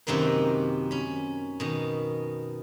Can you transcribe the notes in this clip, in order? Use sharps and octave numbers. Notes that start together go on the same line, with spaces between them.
F#2 C3 D#3 A#3 B4
C#4 B5
B2 D#3